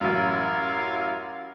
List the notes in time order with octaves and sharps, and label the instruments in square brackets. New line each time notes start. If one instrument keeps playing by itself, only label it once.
[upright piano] A1 F#2 [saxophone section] E4 A#4 F5